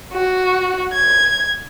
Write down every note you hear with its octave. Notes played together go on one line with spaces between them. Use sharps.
F#4
G#6